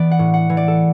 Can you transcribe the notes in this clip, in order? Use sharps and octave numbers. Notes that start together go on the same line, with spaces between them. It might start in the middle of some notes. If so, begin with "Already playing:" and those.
Already playing: E3 B3 D5
F#5
A2
F#5
E3
D5
A4